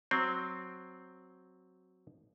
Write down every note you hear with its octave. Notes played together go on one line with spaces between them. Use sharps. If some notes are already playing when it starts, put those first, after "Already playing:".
F#3 C4